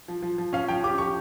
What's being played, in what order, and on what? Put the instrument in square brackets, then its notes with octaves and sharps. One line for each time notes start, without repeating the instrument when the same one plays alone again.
[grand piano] F3
F3
F3
[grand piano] C#4 [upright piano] F5
[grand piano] F3 [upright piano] G5
[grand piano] G4 [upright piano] D6
[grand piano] G4 [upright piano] C#6